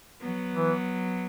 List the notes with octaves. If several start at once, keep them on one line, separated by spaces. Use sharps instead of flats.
F#3 B3
E3